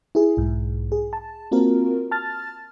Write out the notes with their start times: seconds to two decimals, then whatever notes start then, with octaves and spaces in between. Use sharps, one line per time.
0.15 E4 G#4
0.37 B1 G#2
0.92 G#4
1.13 A5
1.52 A#3 C4 F4 F#4 A#4
2.11 A5 F6 A6